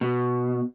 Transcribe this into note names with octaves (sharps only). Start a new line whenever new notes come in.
B2